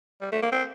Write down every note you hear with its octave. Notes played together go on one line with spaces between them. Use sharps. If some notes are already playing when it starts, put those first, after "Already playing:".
G3
A3
A#3
C4